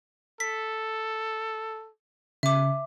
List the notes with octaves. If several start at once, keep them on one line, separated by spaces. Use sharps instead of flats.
A4 B6
C#3 E5 D6